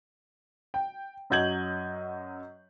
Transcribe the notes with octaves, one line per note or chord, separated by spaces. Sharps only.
G5
F#2 F#3 D#5 G6 G#6 F#7